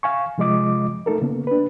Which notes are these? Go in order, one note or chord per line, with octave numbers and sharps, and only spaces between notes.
F5 G#5 C#6
C3 F3 G#3 F4 D#5 D6
A3 D#4 A4 A#4
C#3 A#3 B3
D4 B4